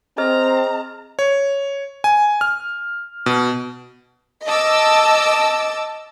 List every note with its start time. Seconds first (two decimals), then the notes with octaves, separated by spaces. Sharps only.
0.18 C4 G#4 D#5 A#5 F6
1.19 C#5
2.04 G#5
2.41 F6
3.26 B2
4.45 D#5 A5 D6 E6